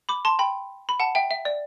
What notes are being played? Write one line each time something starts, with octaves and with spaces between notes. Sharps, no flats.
B5 D6
A5 C6
G5 B5
B5
F#5 A5
E5 G5
E5
D5